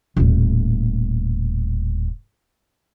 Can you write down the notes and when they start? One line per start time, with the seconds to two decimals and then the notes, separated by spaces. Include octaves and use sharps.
0.17 D#1 A2